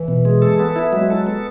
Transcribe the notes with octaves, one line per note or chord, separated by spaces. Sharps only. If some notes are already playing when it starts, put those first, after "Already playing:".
Already playing: E3
B2
G#3
A4
B3
E4
F#3 G#3
A4
B3